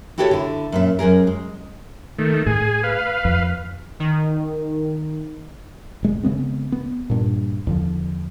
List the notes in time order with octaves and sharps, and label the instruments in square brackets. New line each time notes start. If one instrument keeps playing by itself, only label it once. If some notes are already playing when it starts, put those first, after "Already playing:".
[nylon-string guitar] E4 F#4 G4 A4 A#4 C#5
D3 E4
F#2 A#2 E5
F#2 B2 G#4 A#4
G#3
[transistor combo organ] D#3 A3
[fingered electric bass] A2 [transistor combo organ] G#4
[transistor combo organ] B4 F5
[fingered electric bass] F2
[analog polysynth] D#3
[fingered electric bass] D#1 G#3
C#3 G#3 B3 C4
B3
G2 A#2
E2 D3 F3